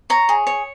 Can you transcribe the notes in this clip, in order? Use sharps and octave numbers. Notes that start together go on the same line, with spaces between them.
C#5 A#5
G#4
C#5